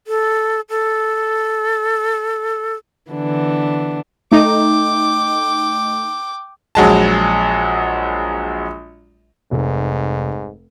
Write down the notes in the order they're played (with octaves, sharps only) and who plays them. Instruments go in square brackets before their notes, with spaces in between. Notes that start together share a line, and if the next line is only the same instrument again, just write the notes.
[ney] A4
A4
[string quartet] D3 E3 B3 D4
[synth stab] A3 D#4 [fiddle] G5 D6
[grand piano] A#1 F#3 G#3 A5
[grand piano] F1 [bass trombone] G#2